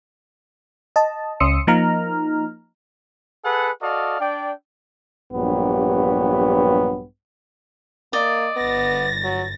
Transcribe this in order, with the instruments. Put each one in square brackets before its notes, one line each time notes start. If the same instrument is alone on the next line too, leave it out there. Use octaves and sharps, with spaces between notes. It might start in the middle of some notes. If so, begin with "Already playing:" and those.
[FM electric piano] D#5 A5
C#2 C#4 C6 D#6 E6 C#7
F3 A#3 D#4 A#5 F6
[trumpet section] G#4 A4 B4 F#5
F#4 A4 D5 D#5 F5
D4 D5 G5
[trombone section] A#1 G2 F#3 B3 G4
[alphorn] A#3 [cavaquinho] D5 D#5
[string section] G1 A6 A#6 [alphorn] B3
[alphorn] F#3